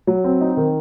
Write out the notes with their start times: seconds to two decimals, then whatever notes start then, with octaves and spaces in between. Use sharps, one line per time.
0.07 F#3
0.24 C4
0.41 D#4
0.57 D#3